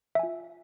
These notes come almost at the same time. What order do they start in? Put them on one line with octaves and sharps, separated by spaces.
E5 G#5 F4